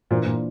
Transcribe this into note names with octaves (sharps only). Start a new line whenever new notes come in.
A#2 E3 A#3 D4 F4 C5
A#2